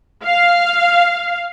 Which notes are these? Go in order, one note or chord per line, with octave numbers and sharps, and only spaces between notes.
F5